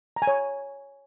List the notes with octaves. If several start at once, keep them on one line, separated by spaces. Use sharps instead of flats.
A#5
G#5
C#5